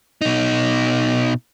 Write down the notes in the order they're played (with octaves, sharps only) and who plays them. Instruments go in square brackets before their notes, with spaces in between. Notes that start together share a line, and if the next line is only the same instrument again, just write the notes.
[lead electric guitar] B2 D#4